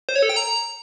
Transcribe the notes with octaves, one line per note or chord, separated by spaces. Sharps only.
C5
C#5
A4
G5
A#5